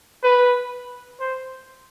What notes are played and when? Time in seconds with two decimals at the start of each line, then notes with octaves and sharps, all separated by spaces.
0.24 B4
1.20 C5